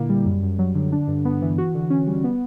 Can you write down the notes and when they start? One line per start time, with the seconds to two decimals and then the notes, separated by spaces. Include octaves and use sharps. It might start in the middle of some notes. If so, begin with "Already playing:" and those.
Already playing: A#2 D3 A#3 E4
0.09 G3
0.26 F#2
0.43 F#2
0.59 F#3
0.75 D3
0.92 D4
1.08 G2
1.25 B3
1.42 E3
1.58 F#4
1.74 D3
1.90 C#4
2.07 G3
2.24 B3